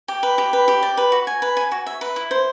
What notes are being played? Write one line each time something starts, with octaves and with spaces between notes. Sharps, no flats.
G4
B4
G4
B4
G4
D5
B4
F#4
G#5
B4
G#5
F#4
E5
B4
E4
C5